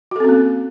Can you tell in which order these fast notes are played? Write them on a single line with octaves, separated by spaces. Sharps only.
F#4 A4 C4 C#4 A#3